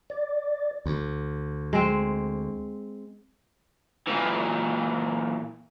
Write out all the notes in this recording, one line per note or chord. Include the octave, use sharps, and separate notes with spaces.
D5
D2
G#3 C4
A#2 E3